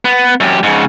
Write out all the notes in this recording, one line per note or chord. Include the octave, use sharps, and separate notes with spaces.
B3
F#2 G4
G#2 C#3